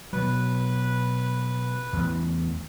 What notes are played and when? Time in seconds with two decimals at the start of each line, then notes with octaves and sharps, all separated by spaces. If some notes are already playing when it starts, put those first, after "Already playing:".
0.13 B2 F#3 B4
1.93 A1 E2